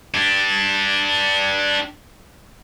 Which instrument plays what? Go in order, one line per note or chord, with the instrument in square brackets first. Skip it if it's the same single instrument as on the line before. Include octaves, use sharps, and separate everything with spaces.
[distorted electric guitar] D4 G4